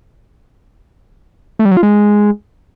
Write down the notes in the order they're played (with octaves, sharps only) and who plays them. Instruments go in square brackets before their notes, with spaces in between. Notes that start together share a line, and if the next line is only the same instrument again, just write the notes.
[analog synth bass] A3
G3
F#3
F4
G#3